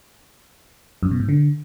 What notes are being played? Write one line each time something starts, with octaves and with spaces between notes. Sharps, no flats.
F#2
B2
G#2
D3